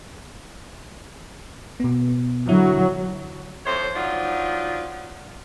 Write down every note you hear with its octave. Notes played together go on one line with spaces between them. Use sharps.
B2 B3
D3 F#3 E4
F2 A2 C5 C#5
F3 F#3 D4 D#4 F4